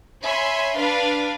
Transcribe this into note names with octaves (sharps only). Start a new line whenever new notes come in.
C#5 E5 G#5 B5 C6
D4 B4 F5